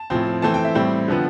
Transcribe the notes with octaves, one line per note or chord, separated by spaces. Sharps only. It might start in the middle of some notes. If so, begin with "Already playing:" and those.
Already playing: A5
A2 F3 C4
E3 A3 C4 A5
G5
E5
A2 G3 C4
D3 F3 B3